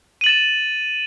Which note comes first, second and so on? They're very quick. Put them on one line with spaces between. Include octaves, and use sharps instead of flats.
D#7 F#7 A6 E7